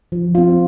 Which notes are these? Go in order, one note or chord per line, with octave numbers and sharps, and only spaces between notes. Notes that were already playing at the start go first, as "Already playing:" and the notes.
F3
C4 F4